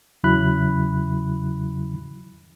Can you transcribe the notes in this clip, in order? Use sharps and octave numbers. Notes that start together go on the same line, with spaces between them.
E2 C#3 F#3 E4 B5 F#6